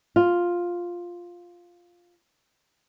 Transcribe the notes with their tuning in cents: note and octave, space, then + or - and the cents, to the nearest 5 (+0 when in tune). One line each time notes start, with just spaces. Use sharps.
F4 +5